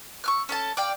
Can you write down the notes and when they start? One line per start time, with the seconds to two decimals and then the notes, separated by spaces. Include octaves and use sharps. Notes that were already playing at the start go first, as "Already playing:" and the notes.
0.24 C#6 E6 F6
0.49 C#4 A4 A5
0.77 D5 F5 G5